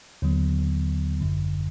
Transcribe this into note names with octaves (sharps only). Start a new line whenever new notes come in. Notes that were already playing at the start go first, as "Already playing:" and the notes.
D#2 D3 F#3 B3
G1 F#2 D3